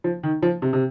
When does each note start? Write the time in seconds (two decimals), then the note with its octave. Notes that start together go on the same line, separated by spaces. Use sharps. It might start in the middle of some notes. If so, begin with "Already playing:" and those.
0.04 F3
0.23 D#3
0.42 F3
0.62 C3
0.73 C3